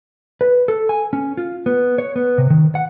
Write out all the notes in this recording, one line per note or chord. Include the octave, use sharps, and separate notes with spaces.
B4
A4
G#5
C#4
F4
B3
C#5
B3
C3
D#3
F#5